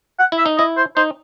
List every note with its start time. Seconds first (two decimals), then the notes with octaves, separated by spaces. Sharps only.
0.19 F#5
0.32 E4
0.38 E5
0.46 D#4
0.58 E4 D#5
0.77 C5
0.96 D#4 C5